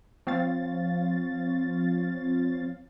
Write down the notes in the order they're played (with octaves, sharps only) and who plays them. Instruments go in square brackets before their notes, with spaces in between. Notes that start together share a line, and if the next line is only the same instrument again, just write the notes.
[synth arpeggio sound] F3 C4 C#5 F5 A6